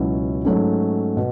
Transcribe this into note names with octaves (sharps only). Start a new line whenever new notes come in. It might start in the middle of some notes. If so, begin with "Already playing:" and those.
Already playing: C#2 B2 F#3 C#4 E4
G#2 F#3 A3 C#4
B2